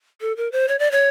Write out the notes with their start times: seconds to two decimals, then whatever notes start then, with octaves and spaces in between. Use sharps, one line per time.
0.21 A4
0.37 A#4
0.52 C5
0.68 C#5
0.79 D5
0.91 C#5